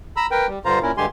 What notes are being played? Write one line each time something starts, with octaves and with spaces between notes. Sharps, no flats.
A#5 B5 E6
A#4 B4 G5
G3
G2 D3 F4 C5 F5 A#5
A#2 C#4 E4 A#4
G2 D3 G#3 G4 G#5 C6